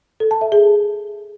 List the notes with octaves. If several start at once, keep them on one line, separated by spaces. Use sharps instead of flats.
A4
A5
E5
G#4